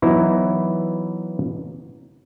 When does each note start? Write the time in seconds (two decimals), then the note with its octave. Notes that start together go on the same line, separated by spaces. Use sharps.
0.02 E3 F#3 B3 D#4 E4